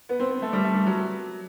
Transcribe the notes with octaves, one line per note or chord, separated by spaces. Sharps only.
B3
C4
B3
A3
G3
A3
G3
F#3